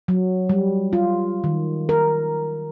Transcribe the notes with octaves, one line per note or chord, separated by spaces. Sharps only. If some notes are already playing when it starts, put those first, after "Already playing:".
F#3
G3
F4
D#3
A#4